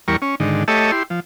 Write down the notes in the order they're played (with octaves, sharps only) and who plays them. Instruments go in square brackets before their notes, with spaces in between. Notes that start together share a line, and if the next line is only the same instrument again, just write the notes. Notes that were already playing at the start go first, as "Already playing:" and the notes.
[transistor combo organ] E2 G3 A#4 C#6
C#4
G#2 D3 D#3
A3 G4 A4 C#5 D#5 E5
E4 G4 C6
F3